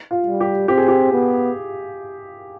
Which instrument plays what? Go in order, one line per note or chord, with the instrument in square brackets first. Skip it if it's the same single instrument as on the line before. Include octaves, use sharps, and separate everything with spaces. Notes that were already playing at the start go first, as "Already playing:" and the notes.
[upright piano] F4
[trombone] G3
[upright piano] G4
[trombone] C4 [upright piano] G4
[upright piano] G#4
G4
[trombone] B3